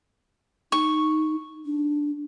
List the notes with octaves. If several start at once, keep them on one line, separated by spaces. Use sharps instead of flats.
D#4 C#6
D4